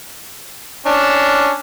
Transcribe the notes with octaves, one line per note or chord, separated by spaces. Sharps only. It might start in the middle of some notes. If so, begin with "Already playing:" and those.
C#4 D4